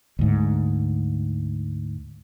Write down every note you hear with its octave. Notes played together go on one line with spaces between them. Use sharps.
D2 G#2